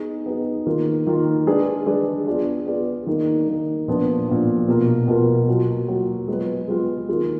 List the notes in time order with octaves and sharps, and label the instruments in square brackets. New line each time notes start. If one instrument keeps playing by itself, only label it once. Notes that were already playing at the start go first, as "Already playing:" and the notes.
Already playing: [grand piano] B3 D#4 G#4
B3 D#4 G#4
D#3 A#3 F4 A#4
D#3 A#3 F4 A#4
G#3 D4 G#4 B4 D5
G#3 D4 G#4 B4 D5
B3 F4 G#4 D5
B3 F4 G#4 D5
D#3 A#3 D#4
D#3 A#3 D#4
A#2 F3 B3 D4
A#2 F3 B3 D4
B2 A#3 F4 A#4
B2 A#3 F4 A#4
F#3 A#3 F4
F#3 A#3 F4
G#3 B3 F4 B4
G#3 B3 F4 B4
D#3 A#3 F4 G#4